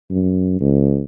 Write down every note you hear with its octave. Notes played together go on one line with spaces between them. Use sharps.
F#2
C#2